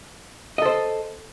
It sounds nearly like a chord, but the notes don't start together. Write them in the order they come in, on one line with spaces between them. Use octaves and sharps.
D#5 A4 C5